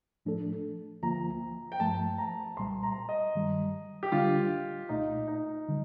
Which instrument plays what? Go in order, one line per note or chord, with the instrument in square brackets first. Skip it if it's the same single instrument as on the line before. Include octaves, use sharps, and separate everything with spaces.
[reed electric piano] A2 F3 A3 D4 A4
[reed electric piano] D2 D3 F3 A#3 F4 [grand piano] A#5
[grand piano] G5
[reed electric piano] G2 F3 A3 [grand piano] A5
[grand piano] A#5
[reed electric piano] C2 A#2 G3 [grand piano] C6
[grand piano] A#5
D#5
[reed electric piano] G2 D#3 G3
[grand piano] G4
[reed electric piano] D3 G3 D4 [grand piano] F4
[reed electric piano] C2 A#2 A3 [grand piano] D#4
[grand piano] D#4
[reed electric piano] D3 G3